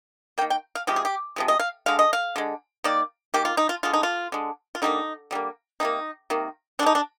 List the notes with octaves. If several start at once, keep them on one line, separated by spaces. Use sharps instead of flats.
D#3 A#3 G5
G5
F5
C3 F3 G#3 G4
G#4
G4
C3 F3 G#3
D#5
F5
D3 G#3 F5
D#5
F5
D3 G#3
D#3 A#3 D5
D#3 A#3 G4
F4
D#4
F4
D3 G#3 F4
D#4
F4
D3 G#3
F4
D3 G3 A#3 D#4
D3 G3 A#3
C3 D#3 A#3 D#4
C3 D#3 A#3
D3 G#3 D4 D#4
D4